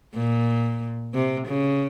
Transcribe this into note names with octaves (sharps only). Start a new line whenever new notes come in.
A#2
C3
C#3